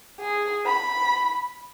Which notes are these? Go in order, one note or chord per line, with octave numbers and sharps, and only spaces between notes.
G#4
B5